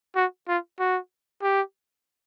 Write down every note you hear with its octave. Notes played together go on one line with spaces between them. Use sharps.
F#4
F4
F#4
G4